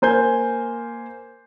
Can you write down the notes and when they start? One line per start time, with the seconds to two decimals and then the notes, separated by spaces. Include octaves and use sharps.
0.02 A#3 C5 G#5 G6